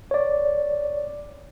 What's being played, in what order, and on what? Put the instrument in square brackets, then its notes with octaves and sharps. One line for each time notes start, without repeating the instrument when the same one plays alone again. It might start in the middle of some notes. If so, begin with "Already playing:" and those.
[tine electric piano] C#5 D5